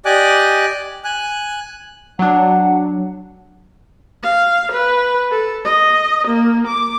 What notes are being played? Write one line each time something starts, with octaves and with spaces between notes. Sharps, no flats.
G4 D5 D#5 G#5 D6 F#6
G#5 F#6
F#3 D4 F#5
F5
B4
A4
D#5
A#3
D6